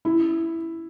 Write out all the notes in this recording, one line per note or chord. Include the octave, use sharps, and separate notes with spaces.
E4